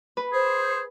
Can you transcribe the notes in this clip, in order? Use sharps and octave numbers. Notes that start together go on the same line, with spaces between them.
B4
G#4 C5